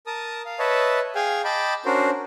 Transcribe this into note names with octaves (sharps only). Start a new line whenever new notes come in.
A#4 A5 D#6
F5
B4 C#5 D#5 E5 A5
G#4 F5 G5 G#5
D#5 G5 A5 B5 D6
C#4 D4 F#4 A#4 C5